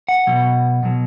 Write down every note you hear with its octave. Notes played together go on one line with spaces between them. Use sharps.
F#5
B2 F#3
B2 F#3